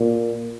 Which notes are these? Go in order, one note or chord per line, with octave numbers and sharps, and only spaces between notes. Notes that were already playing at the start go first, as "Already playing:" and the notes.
Already playing: A#2